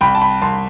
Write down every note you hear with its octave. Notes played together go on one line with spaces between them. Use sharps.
C2 G5 B5
A5
G5 B5
C2 A5 C6